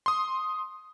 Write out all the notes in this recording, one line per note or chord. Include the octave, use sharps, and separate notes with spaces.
C6 D#6